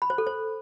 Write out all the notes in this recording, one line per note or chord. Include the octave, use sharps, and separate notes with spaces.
B5
C5
A4
C5